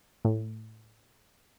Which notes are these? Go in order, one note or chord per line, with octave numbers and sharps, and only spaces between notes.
A2